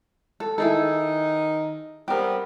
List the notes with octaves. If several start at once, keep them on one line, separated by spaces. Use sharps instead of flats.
A4
D#3 D#4 E4 G#4 A4
G3 B3 C4 G4 A#4